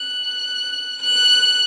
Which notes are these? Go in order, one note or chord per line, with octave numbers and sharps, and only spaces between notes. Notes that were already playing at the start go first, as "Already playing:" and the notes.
Already playing: F#6
F#6